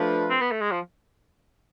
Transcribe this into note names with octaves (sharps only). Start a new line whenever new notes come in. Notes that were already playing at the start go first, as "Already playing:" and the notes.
Already playing: F3 A3 D4 F4 B4
C4
B3
A3
G#3
F3